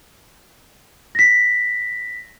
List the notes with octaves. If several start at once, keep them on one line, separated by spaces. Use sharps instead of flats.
A#6 B6